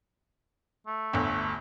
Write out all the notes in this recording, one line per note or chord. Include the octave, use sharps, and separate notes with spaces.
A3
G1 D2